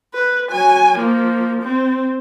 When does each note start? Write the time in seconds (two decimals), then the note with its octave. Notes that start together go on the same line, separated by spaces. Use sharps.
0.14 B4
0.51 F#3 G#5
0.97 F3 A#3
1.62 C4